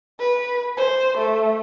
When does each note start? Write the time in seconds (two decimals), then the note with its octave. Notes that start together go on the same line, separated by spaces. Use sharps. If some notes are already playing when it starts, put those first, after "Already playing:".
0.19 B4
0.77 C5
1.18 A3